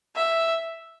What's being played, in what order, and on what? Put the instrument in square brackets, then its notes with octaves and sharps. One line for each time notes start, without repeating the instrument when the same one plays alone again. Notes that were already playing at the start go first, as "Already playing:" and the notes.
[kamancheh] E5